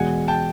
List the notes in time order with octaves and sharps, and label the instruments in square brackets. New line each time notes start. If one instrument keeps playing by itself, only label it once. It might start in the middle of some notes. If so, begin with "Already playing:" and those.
Already playing: [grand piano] E2 B2 G#3 [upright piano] F#5 G#5
[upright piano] G5 A5